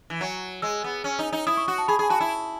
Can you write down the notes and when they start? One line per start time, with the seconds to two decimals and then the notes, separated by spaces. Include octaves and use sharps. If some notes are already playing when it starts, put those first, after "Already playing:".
0.10 E3
0.21 F#3
0.62 G#3 E6
0.84 B3
1.04 C#4
1.19 D#4
1.33 D#4
1.47 E4 D#6
1.57 C#6
1.68 F#4 C#6
1.78 A5
1.88 G#4 B5
1.99 G#4
2.10 F#4 A5
2.20 E4